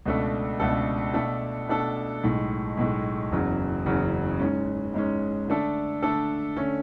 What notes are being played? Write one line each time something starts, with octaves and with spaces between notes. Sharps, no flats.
C#2 B2 A3 D4 A4
C#2 B2 A3 D4 A4
B2 A3 D4 A4
B2 A3 D4 A4
B1 A2 G#3
B1 A2 G#3
F#1 E2 C#3 F#3 C#4
F#1 E2 C#3 F#3 C#4
G#2 G#3 C#4
G#2 G#3 C#4
D3 A3 D4 A4
D3 A3 D4 A4
D3 A3 C#4